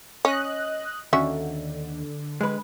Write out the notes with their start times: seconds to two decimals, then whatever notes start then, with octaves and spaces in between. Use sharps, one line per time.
0.25 C#4 D#5 F#6
1.13 D#2 D3 C#4 F#4 E5
2.41 G#3 B4